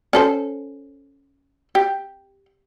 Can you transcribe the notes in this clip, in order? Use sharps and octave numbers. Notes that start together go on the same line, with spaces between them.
C#4 A4 C5
G4